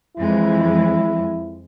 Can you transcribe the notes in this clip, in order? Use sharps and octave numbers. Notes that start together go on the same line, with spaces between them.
F2 E3 G#3 E4